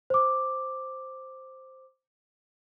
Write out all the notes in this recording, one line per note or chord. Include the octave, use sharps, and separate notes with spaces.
C5 D6